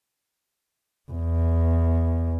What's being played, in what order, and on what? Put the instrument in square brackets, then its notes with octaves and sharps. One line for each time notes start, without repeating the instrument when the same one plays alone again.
[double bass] E2